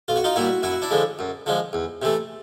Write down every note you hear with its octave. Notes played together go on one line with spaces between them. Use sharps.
B1 F4
F#4
D#4 F4
A#2 G3 E4 F#4
F#2 E4 F#4
D4 E4
D3 F3 G#3
F#2
D3 F3 G#3
E2
C3 E3 A3